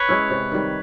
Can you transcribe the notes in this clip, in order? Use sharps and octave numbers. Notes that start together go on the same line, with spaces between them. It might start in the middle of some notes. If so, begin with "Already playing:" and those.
Already playing: B4 C#5
G#3 C#4 E4
C3
D#3 G3